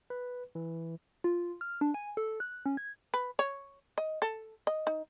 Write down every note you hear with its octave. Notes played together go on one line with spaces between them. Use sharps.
B4
E3
F4
F6
D4
G#5
A4
F#6
C#4
G#6
B4
C#5
D#5
A4
D#5
D#4